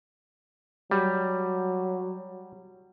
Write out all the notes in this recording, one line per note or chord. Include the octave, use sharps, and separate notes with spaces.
F#3 G3